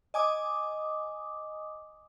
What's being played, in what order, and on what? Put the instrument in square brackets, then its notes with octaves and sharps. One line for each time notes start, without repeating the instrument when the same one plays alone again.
[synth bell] D#5 G#5 D6 D#6